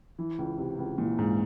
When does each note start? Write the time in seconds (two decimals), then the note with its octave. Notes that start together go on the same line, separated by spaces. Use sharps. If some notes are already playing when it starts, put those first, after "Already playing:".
0.19 E3
0.39 C#2
0.58 C3
0.79 C#2
0.98 A#2 E3
1.18 C#2 G#2